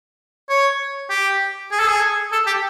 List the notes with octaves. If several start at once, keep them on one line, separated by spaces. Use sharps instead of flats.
C#5
G4
G#4
A4
G#4
A4
G4